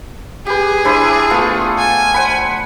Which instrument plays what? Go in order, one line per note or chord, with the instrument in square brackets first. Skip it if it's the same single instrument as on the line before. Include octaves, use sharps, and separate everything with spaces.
[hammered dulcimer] G4 B4 [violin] G#4
[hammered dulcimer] D4 E4 C5
A3 B3 F4
[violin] G#5
[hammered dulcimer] C5 F#5 B5